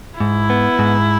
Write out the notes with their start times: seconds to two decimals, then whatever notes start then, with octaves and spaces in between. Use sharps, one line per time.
0.19 G#2 E4
0.50 B3
0.79 G#2